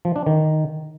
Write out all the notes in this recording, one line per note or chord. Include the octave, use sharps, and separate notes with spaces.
F3
D4
D#3